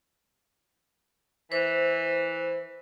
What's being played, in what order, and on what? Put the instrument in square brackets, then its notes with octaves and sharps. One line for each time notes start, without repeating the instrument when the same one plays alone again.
[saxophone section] E3 [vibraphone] C5